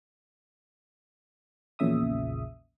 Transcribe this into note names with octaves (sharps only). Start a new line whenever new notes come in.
A#1 E2 A#2 C#3 E5 D#6